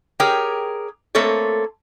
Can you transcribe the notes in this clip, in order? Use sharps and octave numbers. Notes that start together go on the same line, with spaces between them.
G4 G#4 A#4 C#5 G5
A3 A#3 C4 A4 C#5